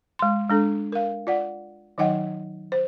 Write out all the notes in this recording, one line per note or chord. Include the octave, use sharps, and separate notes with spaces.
G#3 C6
G#3 D4 A4
A#4 F5
F4 D5 F#5
D#3 F#3 D#4 D#5 F#5 G5
C5